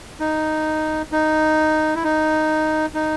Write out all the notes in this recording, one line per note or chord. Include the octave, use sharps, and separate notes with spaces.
D#4
D#4
E4
D#4
D#4